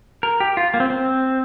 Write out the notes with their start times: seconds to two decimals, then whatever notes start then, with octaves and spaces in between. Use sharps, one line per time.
0.23 A#4
0.40 G4
0.57 F4
0.74 A#3
0.80 C4
0.90 C4